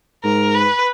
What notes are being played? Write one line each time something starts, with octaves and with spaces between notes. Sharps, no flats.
G#2 A#4
B4